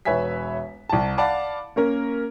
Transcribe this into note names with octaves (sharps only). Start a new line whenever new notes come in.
E1 B4 C#5 E5 G#5 B6
C2 A5
D5 F5 F#5 A5 B5 D6
A#3 C#4 A#4